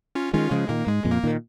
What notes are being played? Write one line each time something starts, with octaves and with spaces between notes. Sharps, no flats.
C#4 F4
D#3 G#3 C#4 F4
C#3 F3 G#3
A#2 D#3 A#3
G#2 G#3
F2 A#2
A#3
A#2 D#3